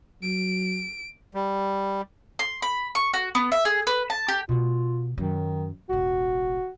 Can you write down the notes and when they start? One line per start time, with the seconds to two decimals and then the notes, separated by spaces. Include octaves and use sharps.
0.23 F#3 D7
1.34 G3
2.39 C6
2.62 B5
2.95 C#6
3.14 F#4
3.35 B3
3.52 E5
3.65 G#4
3.87 B4
4.10 A5
4.28 G4
4.49 B2 A3 F4
5.18 F#2 D#3 F#3
5.89 E1 A1 F#4